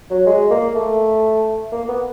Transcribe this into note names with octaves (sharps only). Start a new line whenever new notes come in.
F#3
G#3
A#3
A3
A#3
B3